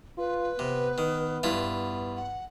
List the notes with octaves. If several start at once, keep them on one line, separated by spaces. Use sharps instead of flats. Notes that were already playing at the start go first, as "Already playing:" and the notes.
F4 B4
C3 B3
D#3
G2 E4 F4
F#5